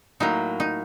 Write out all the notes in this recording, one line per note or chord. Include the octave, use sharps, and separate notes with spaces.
A2 F#3 A#3 D#4
D#4